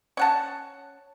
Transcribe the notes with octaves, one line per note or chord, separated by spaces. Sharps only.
C#4 F#5 A5